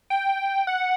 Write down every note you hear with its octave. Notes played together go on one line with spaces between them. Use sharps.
G5
F#5